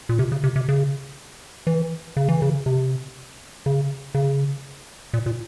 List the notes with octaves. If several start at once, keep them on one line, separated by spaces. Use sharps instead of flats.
A#2
C3
C#3
C3
C3
C#3
E3
C#3
E3
C#3
C3
C#3
C#3
A#2
A#2